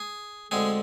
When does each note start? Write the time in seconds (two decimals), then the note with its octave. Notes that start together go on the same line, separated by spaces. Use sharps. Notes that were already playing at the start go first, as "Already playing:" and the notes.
Already playing: G#4
0.51 D2 D3 G#3 C4 G#4